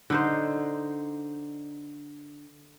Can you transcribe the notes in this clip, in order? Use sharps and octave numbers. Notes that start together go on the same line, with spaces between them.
D3 D#4 C5